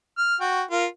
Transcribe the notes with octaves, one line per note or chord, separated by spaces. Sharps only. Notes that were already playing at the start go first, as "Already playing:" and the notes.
F6
F#4 G5
F4 A#4